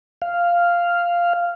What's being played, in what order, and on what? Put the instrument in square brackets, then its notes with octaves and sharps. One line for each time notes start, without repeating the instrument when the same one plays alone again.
[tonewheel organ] F5